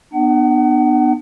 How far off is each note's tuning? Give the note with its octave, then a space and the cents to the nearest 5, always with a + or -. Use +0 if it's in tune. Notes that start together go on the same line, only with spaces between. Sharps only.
B3 +0 D4 +45 F#5 +35